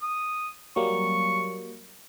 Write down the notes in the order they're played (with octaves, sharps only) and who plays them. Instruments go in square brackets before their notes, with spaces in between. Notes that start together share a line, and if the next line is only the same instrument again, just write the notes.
[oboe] D#6
[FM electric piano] F#3 G3 A#3 [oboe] C#6